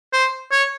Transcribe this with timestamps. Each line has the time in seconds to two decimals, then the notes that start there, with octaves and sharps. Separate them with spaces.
0.13 C5
0.51 C#5